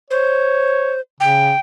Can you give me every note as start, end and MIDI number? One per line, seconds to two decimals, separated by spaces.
0.11 1.00 72
0.11 0.94 73
1.20 1.52 49
1.20 1.60 79